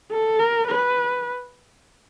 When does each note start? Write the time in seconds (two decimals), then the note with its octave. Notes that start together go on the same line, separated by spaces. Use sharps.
0.11 A4
0.39 A#4
0.68 B4